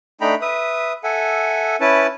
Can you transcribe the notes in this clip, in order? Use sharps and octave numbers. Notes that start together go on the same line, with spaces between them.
A3 D4 D#4 G5 A#5 B5
B4 E5 D#6
A4 E5 F#5 G#5
C#4 E4 B4 A5